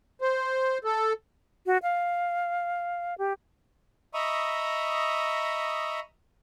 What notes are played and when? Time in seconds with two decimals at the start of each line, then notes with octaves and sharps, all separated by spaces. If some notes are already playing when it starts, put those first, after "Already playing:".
0.21 C5
0.84 A4
1.66 F#4
1.83 F5
3.18 G4
4.14 D#5 E5 A#5 B5 C#6 D#6